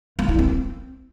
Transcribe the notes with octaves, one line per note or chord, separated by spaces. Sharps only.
A#3
E4
C4